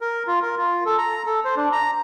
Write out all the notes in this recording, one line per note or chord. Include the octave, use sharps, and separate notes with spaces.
A#4
F4
A#4
F4
A4
A#5
A4
C5
D4
A#5